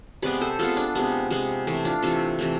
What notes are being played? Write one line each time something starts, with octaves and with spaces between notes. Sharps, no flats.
C3 G#3 B3 B4 D5
A4 C5
C3 G#3 B3 F4 A4
D4 F4
C3 G#3 B3
C3 G#3 B3
C3 E3 A3
D4 F4
C3 E3 A3 F4 A4
C3 E3 A3